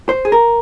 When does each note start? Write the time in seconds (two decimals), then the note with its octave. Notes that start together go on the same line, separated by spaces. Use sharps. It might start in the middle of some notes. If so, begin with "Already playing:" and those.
0.09 C5
0.25 G#4
0.32 A#4